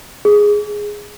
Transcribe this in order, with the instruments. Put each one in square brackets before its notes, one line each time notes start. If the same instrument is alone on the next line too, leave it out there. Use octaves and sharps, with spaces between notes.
[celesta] G#4